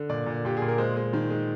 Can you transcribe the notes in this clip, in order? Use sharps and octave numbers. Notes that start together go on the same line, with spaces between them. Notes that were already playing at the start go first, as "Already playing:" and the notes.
Already playing: D3
A#2 D5
A#2
A#2 G4
G#4
A#2
A#4
G#3 C5
G#3
D#3
G#3